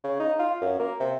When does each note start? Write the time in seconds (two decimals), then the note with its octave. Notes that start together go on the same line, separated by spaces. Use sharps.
0.04 C#3
0.19 D#4
0.39 F4
0.61 F#2
0.79 A#3
1.00 C3